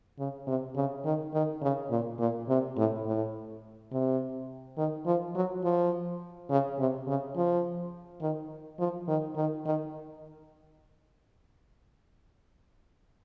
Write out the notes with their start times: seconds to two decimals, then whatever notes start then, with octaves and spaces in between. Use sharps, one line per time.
0.18 C#3
0.47 C3
0.75 C#3
1.05 D#3
1.34 D#3
1.62 C#3
1.90 A#2
2.19 A#2
2.48 C3
2.77 A2
3.05 A2
3.91 C3
4.77 D#3
5.06 F3
5.35 F#3
5.64 F3
6.50 C#3
6.79 C3
7.07 C#3
7.36 F3
8.21 D#3
8.79 F3
9.08 D#3
9.36 D#3
9.65 D#3